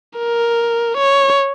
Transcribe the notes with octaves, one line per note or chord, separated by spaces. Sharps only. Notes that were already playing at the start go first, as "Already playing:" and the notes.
A#4
C#5